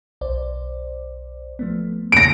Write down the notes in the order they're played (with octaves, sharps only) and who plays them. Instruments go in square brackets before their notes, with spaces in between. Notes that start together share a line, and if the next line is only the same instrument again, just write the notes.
[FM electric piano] B1 C5 D5
F3 A3 B3
[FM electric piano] C#3 A#3 [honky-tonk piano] A#6 D7